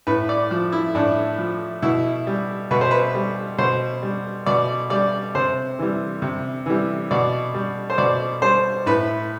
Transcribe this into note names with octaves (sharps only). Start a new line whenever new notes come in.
A2 B4
D5
F3
E4
A2 D4
F3
B2 E4
G3
B2 B4
C5
B4
G3
B2 C5
G3
B2 D5
G3 D5
C3 C5
E3 G3
C3
E3 G3
B2 D5
G3
C5
B2 D5
G3 C5
A2 B4